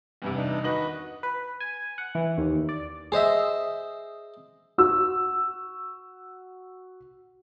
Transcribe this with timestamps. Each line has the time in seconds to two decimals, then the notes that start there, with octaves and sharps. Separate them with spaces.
0.22 E2 G2 C3
0.36 D4 D#4
0.64 D#3 F#4 B4 D#5 F#7
1.23 B4
1.60 G#5
1.98 F#5
2.15 E3
2.38 D#2
2.69 D5
3.12 G#4 C5 D#5 E5
4.78 F#4 E6